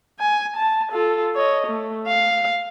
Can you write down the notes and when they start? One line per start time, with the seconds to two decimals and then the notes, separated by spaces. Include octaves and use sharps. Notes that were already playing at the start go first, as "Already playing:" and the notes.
0.20 G#5
0.57 A5
0.92 F4 A4
1.35 C#5 D#5
1.67 A3
2.07 F5